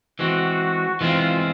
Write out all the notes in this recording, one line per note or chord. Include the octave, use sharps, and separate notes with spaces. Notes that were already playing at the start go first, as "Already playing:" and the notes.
E3 G#3 C4 F#4
E3 G#3 C4 F4